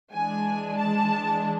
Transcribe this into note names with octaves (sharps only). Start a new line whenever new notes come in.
E3 G#3 D4 G#5
A5